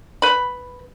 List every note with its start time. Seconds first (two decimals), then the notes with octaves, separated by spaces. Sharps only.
0.22 B4 B5